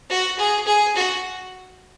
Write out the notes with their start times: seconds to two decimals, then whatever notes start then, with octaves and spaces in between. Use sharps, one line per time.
0.09 F#4
0.38 G#4
0.66 G#4
0.96 F#4